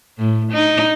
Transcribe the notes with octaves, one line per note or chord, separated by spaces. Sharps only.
A2
D#4